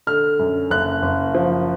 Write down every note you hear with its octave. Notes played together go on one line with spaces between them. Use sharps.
D3 F6
F#2
F#1 F#6
F#1
F3